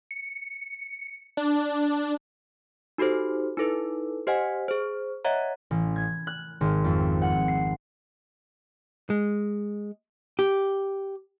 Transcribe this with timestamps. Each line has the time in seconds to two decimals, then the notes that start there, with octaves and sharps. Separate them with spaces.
0.11 C#7
1.37 D4
2.98 D#4 F#4 G4 A4 C5
3.57 D#4 E4 A4 B4
4.27 G4 C5 D#5 F#5 G#5
4.68 G#4 C5
5.25 C#5 D#5 E5 F#5 A#5
5.71 A1
5.96 G#6
6.27 F#6
6.61 G#1
6.84 F2
7.22 F#5
7.48 C7
9.10 G#3
10.39 G4